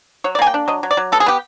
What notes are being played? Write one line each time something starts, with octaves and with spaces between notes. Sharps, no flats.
F#3 C#5
D5
A#3 G#5
G5
D4
F#3 D#5
F#3
D5
F#3
B3 A4
G#4
B3 G4